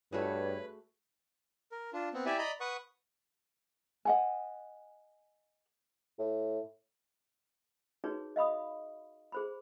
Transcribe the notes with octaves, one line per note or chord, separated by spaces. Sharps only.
G2 A3 F#4 G#4 B4 C#5
A#4
D4 F4
B3 C4
E4 G4 D5 E5 G#5
D5 D#5 A#5 B5
B4 F#5 C#6 D#6
D#5 F#5 G#5
A2
D#4 F#4 G#4 B4 C#5
D#5 F5 B5 D#6
G#4 C5 B5